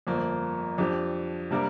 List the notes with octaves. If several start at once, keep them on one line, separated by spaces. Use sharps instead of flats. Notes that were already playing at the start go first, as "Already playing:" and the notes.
G1 F2 F3 A#3
F2 F3 D4 G4
C3 G3 A#3 D4 A#4